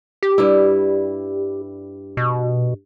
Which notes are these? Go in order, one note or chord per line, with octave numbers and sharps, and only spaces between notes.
G4
G2 G3 E4
B2